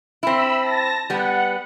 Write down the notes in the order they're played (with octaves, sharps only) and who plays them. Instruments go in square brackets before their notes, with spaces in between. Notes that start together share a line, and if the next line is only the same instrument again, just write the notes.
[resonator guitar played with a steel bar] C4 E4 [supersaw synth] B5 E6
[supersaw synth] A5 A#6
[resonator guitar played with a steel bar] G3 B3 [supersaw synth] F#5